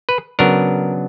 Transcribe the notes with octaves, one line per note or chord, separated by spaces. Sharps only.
B4
C#3 F#3 B3 D4 A#4